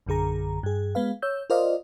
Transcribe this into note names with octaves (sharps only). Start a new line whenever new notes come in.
A#1 F#2 D3 G#4 A#5
G2 G#4
G#3 B3 B4 F5
C#5 E6 G6
F4 A#4 C5 D5 D#5 F5